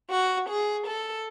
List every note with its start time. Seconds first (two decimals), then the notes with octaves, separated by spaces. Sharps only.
0.10 F#4
0.49 G#4
0.87 A4